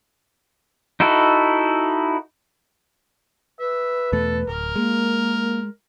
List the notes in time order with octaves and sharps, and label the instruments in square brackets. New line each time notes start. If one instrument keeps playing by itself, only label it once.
[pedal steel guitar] D#4 E4 F#4 A4
[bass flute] B4 [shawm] E5
[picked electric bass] E2 B2 A3 [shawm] A4
[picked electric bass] D1 [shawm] A#4
[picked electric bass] G#3 [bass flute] A#3